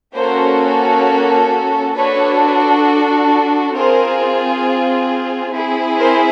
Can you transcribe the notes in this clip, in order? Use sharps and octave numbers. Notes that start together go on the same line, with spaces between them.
A#3 C#4 F#4 A4 A#4 C5
D4 F#4 A4 B4 C#5
C4 F4 G#4 A#4 C5
C4 E4 G#4
A#4 C5